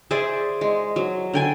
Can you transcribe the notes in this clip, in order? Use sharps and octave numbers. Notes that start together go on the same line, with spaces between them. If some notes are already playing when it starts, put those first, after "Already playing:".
G#4 C5 D5 E5
G#3
F#3
D3 G5 G#5